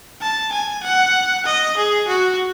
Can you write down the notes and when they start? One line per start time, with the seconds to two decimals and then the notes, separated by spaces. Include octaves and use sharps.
0.21 A5
0.53 G#5
0.84 F#5
1.46 D#5
1.77 G#4
2.08 F#4